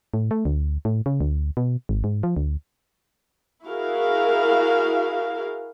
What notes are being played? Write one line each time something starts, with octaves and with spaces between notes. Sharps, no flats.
A2
A3
D2
A2
C#3
D2
B2
G#1
G#2
F3
D2
E4 F#4 G#4 A#4 F5